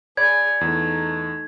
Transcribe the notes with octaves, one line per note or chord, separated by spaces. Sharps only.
G#4 C#5 D5 G#5 B5 G#6
E2 A3 D#4